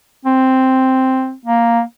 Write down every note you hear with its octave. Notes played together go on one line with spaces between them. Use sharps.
C4
A#3